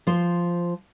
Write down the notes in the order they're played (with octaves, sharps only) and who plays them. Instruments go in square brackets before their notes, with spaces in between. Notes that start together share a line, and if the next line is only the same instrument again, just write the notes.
[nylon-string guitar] F3 C5